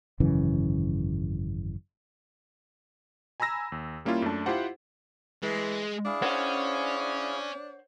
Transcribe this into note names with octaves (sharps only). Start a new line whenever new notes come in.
G#1 F#2 C#3 E3
G#5 A#5 B5 E6 A#6
D#2
G3 A#3 C#4 E4 F4
F#2 A3 D4 A5
E4 F4 G4 C5 F#5
E3 G#3
D4 E4 G#4 F5
C#4 C5 C#5 F#5